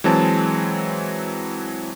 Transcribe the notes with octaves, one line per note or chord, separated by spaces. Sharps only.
E3 F#3 G#3 C4 A5